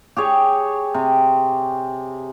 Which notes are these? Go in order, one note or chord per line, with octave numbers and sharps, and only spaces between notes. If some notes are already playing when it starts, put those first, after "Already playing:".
G4 G#4 C#5
C3